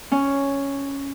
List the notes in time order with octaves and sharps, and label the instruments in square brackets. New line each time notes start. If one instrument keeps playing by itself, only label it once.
[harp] C#4